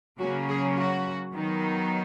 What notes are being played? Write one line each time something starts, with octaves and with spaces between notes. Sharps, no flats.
C#3 F#3 A#3 C#4 F#4
G#4
F#4
D#3 F#3 B3 D#4